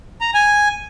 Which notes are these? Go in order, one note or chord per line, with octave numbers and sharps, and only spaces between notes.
A#5
G#5